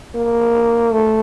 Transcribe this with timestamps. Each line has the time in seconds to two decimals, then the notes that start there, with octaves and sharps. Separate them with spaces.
0.15 A#3
0.92 A3